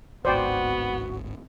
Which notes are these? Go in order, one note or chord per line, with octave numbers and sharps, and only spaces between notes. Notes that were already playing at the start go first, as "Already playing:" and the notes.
D1 G#1 G#2 B3 F#4 C5 D5 G5